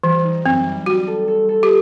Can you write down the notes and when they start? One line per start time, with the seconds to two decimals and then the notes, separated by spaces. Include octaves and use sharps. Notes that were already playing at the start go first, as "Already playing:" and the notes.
0.03 E3 G3
0.24 D#4
0.45 F#2 C4
0.66 G3
0.86 G3 F#4
1.07 A4
1.28 A4
1.49 A4
1.63 G4